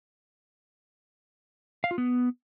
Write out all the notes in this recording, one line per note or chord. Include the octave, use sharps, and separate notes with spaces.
F5
F4
B3